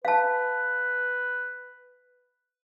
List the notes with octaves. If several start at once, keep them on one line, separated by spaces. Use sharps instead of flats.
B4 F5 A5